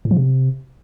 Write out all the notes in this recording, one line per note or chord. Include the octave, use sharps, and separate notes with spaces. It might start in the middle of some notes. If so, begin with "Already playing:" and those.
A2
F3
C3